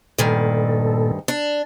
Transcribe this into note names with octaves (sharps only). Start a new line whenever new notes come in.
D2 G2 A#2 D#3 A4
D4